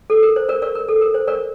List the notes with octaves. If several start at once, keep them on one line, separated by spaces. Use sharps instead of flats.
A4
A#4
C5
A#4 D5
A#4 D5
A#4
A4
A#4
C5
A#4 D5